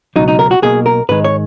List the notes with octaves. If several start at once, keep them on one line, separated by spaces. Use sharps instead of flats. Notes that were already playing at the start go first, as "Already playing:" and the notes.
C#2 B2 F#3 D#4
D#4
A#4
F#4
B1 B2 A#3 G#4
A#4
G#2 D#3 G#3 B4
C#5